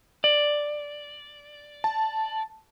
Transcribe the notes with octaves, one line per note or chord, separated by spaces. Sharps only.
D5
A5